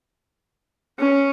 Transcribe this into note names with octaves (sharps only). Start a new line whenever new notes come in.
C#4